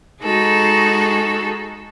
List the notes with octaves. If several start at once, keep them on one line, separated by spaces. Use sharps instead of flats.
G#3 D#4 F#4 G#4 A4